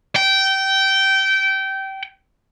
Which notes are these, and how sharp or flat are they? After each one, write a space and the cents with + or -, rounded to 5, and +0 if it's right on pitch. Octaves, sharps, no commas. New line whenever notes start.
G5 -20